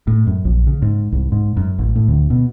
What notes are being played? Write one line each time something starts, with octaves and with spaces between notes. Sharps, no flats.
A2
F#2
A#1
C#3
G#2
C2
G#2
F#2
A1
A2
D2
B2